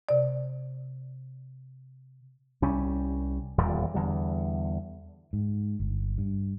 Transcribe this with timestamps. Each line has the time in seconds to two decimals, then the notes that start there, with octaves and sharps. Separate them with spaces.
0.09 C3 D5
2.62 C2 G3 C#4
3.58 D#1 E2 A#2 G3
3.94 E2 D3 G3
5.33 G#2
5.80 G1
6.18 G2